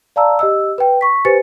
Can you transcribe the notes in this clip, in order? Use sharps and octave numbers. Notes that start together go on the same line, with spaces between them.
D5 F5 A5 A#5 E6
G4 D#5 E6
B4 G5
C#6 B6
G4 B4 C5 G#5 A6 C#7